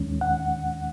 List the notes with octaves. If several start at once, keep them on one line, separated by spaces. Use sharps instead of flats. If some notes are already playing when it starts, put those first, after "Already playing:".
Already playing: D#2 D#3 G#3 C#4
F#5